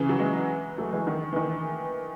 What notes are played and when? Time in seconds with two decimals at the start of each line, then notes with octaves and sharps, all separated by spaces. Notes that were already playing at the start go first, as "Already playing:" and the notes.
Already playing: C#3 E3
0.09 F#3
0.19 E3 G#3
0.77 F#3 A3
0.93 E3 G#3
1.07 D#3
1.32 E3
1.36 D#3